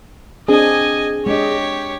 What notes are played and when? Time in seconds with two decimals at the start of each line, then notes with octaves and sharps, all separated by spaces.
0.48 C4 D4 G#4 D#5 G#5
1.26 G#3 D4 G4 C#5 D#5